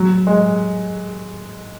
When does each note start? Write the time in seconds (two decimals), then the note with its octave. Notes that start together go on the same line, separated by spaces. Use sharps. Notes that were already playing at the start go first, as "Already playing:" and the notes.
Already playing: F#3
0.27 G#3